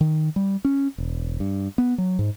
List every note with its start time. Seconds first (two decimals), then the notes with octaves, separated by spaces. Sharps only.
0.01 D#3
0.36 G3
0.65 C#4
0.98 E1
1.40 G2
1.78 B3
1.98 F#3
2.19 G#2